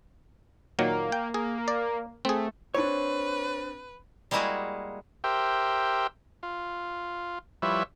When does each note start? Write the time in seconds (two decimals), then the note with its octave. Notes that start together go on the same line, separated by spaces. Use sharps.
0.79 A#2 D#3 F#3 A#3
1.12 G5
1.34 A#3 G#4
1.68 D5
2.25 A3 C4 G#4
2.75 C4 D4 B4 C#5
4.31 G3 G#3 A#3 E4 F#4 G#4
5.24 G4 A#4 C5 E5 G5
6.43 F4
7.62 F3 G3 E4 B4 C#5 E5